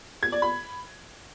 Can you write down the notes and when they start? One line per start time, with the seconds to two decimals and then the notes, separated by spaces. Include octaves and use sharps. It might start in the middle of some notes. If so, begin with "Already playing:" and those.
0.23 G#6
0.32 D5
0.42 B5